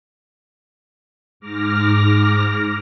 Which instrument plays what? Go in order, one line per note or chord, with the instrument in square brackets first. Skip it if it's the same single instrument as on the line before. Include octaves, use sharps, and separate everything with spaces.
[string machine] G#2 D6 F6 A#6